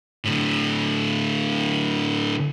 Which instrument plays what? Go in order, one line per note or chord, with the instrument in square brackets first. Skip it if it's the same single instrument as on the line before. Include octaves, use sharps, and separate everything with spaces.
[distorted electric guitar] A2 D3